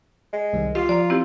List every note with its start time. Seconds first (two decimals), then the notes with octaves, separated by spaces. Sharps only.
0.33 G#3
0.53 C2 D#3 G3
0.75 F4 G4 F5
0.89 F3 D5 A#5
1.10 C4 E4 G4